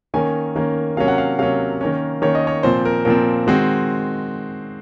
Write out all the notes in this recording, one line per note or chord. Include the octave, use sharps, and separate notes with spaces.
D#3 A#3 C#4 G#5
D#3 A#3 C#4
C3 F#3 A#3 C#4 F5
F#5
F5
C3 F#3 A#3 C#4 F5
D#3 A#3 C#4
D#3 A#3 C#4 C#5
D#5
C#5
A#2 F3 C4 C5
A#4
A#2 F3 C4 A#4
D#3 G#3 C4 F#4